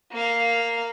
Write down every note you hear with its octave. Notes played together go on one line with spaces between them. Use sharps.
A#3 F5